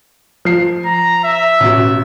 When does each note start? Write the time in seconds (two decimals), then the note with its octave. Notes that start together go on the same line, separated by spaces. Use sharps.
0.45 F3 C7
0.85 A#5
1.24 E5
1.60 A1 B2